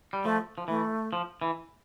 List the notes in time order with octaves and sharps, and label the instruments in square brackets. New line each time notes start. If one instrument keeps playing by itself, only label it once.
[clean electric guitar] G3
[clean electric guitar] F3 [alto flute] A3
[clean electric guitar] F3
[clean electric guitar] E3 [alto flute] A3
[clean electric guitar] F3
E3